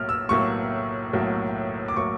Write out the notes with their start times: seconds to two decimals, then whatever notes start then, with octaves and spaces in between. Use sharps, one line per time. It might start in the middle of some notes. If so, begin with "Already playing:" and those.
Already playing: B1 A2 F#3 A#3 F6
0.09 E6
0.29 B1 A2 F#3 A#3 C#6
1.13 B1 A2 F#3 A#3
1.88 D6
1.96 A2 F#3 A#3 C#6